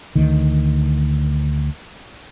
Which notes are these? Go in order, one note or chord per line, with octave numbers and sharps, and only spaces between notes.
D2 D#3